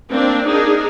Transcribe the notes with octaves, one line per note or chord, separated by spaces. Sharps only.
A#3 C4 D4
D4 D#4 G#4 A#4